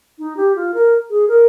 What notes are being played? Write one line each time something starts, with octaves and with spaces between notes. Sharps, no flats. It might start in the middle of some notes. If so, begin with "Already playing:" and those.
D#4
G4
F4
A#4
G#4
A#4